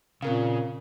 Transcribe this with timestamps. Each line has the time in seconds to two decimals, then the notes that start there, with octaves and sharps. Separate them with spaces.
0.22 A#2 C#3 C4 A#4 F5